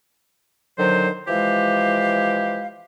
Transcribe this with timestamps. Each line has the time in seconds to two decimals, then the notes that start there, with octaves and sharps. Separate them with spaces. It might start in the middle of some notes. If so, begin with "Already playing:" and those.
0.79 D3 D#3 F#3 C5
1.28 E3 F3 G#3 G4 F5